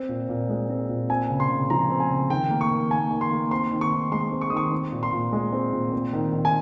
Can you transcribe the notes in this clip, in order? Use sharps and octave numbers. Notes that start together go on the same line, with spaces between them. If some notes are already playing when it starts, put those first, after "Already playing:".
Already playing: C4
A#2
A#2
G#3
C4
A#2
C4 G#5
C#3
C6
C#3
F3 A#5
C4
G#5
C#3
D#3 G5
A#3
C#6
D#3
A#3 G#5
D#3
C6
A#3
C4 C6
D#3
C#6
D#3
G#3 C6
C4
C#6
D#3 D#6
C#6
C4
A#2
C6
A#2
G#3
C4
A#2
C4
D#3
D#3
G#5